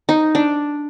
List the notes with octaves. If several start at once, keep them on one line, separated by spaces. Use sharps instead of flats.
D#4
D4